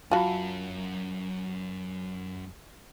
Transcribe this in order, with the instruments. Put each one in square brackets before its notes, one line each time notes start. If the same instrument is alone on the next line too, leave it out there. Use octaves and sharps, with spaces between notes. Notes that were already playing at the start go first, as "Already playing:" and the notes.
[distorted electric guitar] F#2 [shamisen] F4 F#4 [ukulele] A5 B5